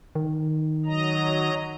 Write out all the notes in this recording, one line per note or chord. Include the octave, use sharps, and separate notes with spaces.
D#3
F#3 D#5 A#5